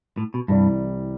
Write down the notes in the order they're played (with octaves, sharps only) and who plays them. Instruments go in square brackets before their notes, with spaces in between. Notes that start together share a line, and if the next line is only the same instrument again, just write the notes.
[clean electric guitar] A2
B2
[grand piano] C2 C3 E3 G3 [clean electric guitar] G2